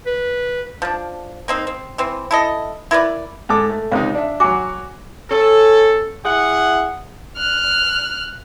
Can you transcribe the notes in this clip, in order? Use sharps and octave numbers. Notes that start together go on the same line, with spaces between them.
B4
F3 D4
A#3 C4 D#4
C4
E3 C4
E4 A4 D#5
E4 A#4 B4 D5
G#2 A4 D6
A3
C#2 C3 D#4 C5 F5
D4 E5
F#3 F#4 G#5 D6
C#4 A4
E4 G#4 F#5
F6 F#6